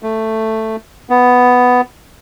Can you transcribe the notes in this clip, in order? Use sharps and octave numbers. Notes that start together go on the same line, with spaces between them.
A3
B3